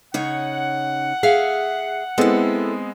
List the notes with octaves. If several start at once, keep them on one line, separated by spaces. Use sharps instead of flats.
C#3 D#4 C#5 F#5
G#4 E5 F5
G#3 B3 C4 E4 A4